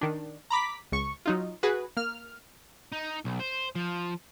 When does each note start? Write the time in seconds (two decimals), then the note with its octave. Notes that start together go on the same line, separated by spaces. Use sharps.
0.01 D#3 D4
0.50 A#5 B5 D6 B6
0.92 C#2 C#6
1.26 F#3 D#4 F4
1.63 F#4 G#4 B4
1.97 A#3 F6
2.92 D#4
3.25 B1
3.40 C5
3.75 F3